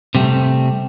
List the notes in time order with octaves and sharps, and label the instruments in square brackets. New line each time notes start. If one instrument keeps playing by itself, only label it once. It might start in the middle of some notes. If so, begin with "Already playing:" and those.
[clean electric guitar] C3 G3 A3